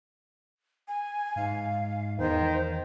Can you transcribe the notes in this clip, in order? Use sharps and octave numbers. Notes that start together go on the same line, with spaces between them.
G#5
G#2 F5
E2 D#3 C5